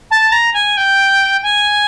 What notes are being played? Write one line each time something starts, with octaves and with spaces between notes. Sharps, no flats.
A5
A#5
G#5
G5
G#5